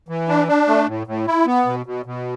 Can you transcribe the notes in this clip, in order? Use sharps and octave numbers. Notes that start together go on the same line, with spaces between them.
E3
D4
D4
A3
A2
A2
E4
B3
B2
B2
B2